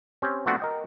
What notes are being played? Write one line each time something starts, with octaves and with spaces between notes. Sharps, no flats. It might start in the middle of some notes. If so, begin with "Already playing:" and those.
C4 C#4 G4
F3 A3 B3 C4 D4 F#4
A#4 D#5 G5